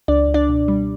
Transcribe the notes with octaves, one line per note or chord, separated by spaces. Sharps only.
C#2 D4 D5
C#2
D4 D5
B2
G3